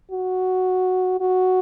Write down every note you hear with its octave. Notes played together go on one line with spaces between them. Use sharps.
F#4
F#4